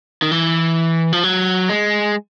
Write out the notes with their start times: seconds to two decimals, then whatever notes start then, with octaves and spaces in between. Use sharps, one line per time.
0.22 D#3
0.31 E3
1.13 F3
1.23 F#3
1.69 G#3